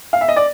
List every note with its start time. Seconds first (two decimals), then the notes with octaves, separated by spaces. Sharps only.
0.13 F5
0.21 E5
0.28 D#5
0.36 D5